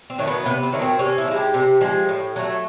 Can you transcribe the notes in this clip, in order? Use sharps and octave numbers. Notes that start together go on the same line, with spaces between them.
C4
D#3 F#3 A3
B3
C3 B3
C4
D#3 F#3 A3
C4
C3 C#4
E4
F3
G#3
G4
C3
F3 G#3
A2
F#3 A3